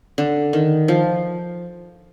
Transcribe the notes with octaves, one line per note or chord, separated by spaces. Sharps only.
D3
D#3
F3